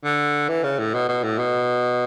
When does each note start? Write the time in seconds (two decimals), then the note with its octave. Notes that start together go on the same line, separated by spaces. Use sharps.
0.04 D3
0.49 E3
0.64 C#3
0.79 A2
0.94 B2
1.09 B2
1.24 A2
1.39 B2